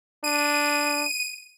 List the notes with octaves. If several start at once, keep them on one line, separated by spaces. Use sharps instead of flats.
D4 D#7